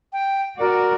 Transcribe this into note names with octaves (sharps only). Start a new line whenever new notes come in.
G5
F#4 A#4 D5